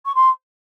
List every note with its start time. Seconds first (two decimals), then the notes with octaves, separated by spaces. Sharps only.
0.05 C#6
0.15 C6